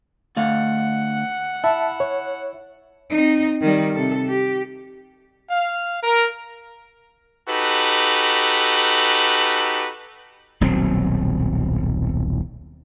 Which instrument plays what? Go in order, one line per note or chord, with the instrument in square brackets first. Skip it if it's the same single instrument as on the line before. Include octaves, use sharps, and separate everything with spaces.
[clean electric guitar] D2 A3 F5 [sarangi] F#5
[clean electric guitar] E4 [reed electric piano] E5 A5
[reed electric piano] C#5
[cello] C4 D#4
D#3 G3
C3 A4
G4
[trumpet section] F5
A#4
D#4 F#4 G4 A4 B4
[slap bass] D#1 B1 F#3 C4